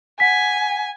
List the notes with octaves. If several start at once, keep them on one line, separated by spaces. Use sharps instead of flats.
F#5 G#5 B6